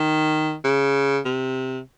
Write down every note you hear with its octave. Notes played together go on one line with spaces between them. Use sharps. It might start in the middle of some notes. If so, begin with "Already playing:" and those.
Already playing: D#3
C#3
C3